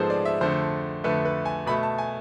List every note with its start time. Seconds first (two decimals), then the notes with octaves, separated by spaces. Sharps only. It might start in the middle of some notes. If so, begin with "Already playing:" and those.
Already playing: G#2 F3 B3 G#4 A4 C5
0.10 D5
0.25 E5
0.41 F2 D3 A3 C5
1.04 F2 D3 A3 B4
1.25 B4
1.45 G#5
1.66 B2 A3 B5
1.83 A5
1.98 G#5